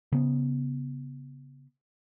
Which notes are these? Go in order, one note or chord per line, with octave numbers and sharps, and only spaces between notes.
C#3 B3